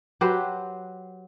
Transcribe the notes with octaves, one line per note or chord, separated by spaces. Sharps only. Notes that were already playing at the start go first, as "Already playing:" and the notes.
F#3 G4 B4 C5